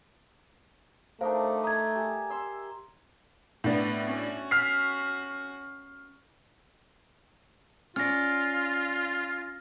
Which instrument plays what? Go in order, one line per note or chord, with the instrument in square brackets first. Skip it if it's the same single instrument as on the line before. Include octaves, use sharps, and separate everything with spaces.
[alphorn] A3 [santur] D4 D#4 A#4 [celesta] C5 F5
[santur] D#5 [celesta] A#5 G#6
[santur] G4 E5 G#5
E5 C6 E6
[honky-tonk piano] A2 D4 [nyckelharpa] B3
[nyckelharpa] C#4 F#4
[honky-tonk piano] F6 B6 C7
[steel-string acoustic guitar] C#4 D5 [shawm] F4 [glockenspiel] F6 A#6